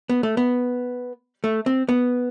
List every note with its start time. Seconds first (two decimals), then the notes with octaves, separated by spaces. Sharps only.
0.09 B3
0.23 A3
0.37 B3
1.44 A3
1.66 C4
1.89 B3